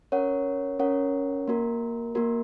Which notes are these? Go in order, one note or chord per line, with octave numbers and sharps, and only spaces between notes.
C#4 A#4 C#5 F#5
C#4 A#4 C#5 F#5
A#3 F#4 A#4
A#3 F#4 A#4